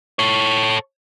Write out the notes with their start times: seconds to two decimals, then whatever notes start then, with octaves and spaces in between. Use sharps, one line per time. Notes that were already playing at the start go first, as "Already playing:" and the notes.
0.19 A4 C#5